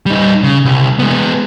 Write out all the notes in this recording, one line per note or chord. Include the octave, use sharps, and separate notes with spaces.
G3 D#4
C#3
C2
G#3 B3